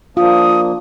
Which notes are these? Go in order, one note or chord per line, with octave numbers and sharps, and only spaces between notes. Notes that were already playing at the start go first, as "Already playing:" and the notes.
F3 A#3 D4 F4 D#6